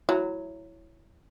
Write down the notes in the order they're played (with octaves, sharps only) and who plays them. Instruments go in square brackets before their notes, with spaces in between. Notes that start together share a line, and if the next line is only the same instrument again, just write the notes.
[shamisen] F#3 [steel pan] E4